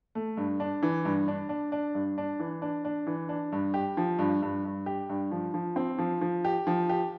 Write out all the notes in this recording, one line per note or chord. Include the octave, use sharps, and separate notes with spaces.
A3
G2
D4
E3
G2
D4
D4
D4
G2
D4
E3
D4
D4
E3
D4
G2
G4
F3
G2
G2
G2
G4
G2
F3
F3
C4
F3
F3
G4
F3
G4